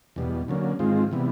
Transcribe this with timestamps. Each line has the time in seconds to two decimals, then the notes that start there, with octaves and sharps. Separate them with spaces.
0.16 E2 B2 G3
0.48 D3 F#3 A#3 C#4
0.79 G#2 D#3 G#3 C4 F4
1.11 C3 E3 G3 B3